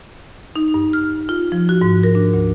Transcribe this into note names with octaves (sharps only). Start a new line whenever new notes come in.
D#4
G2
F6
F4
F3
F#4
G#2
A#4
D4
D2